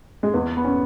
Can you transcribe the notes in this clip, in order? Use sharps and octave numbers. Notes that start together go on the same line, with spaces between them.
G#3
E2 B3
B3
C#4